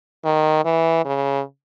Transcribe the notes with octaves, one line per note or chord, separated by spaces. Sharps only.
D#3
E3
C#3